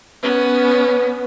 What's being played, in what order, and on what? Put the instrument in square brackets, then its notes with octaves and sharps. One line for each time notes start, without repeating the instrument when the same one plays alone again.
[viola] B3 C#4 [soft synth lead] B4